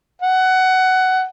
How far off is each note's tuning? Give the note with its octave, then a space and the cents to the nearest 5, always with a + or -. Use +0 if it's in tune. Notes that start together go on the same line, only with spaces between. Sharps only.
F#5 +15